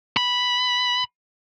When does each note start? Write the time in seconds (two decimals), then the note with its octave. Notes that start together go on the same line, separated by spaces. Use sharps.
0.17 B5